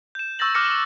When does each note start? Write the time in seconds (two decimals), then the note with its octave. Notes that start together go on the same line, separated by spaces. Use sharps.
0.15 G6 E7
0.39 C#6 E6 G6 A6 A#6 F#7
0.55 D6 F6 F#6 A#6 C#7